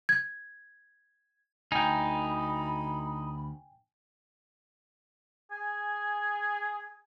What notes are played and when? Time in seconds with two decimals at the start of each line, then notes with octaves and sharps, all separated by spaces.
0.09 G#6
1.72 D2 D#4 G5 G#5 B5
5.51 G#4 G#5